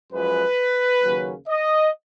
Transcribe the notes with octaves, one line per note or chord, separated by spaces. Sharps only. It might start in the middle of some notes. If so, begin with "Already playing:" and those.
F#2 F3 G#3 B4
D#2 C#3 F#3 A#3 C#4
D#5